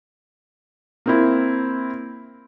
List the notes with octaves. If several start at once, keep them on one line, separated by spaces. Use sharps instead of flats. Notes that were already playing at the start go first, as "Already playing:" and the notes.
A#3 C4 E4